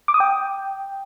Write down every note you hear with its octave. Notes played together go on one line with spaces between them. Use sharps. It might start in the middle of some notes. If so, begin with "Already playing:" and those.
D6
D#6
G5